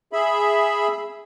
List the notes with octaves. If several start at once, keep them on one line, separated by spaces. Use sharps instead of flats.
G#4 E5 B5